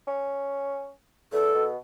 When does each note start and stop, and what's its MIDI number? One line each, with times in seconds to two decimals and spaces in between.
0.07 0.90 61
1.32 1.49 40
1.32 1.63 69
1.54 1.76 47